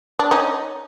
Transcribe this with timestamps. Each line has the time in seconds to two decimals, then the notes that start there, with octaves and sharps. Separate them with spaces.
0.19 D4
0.31 C#4 D#4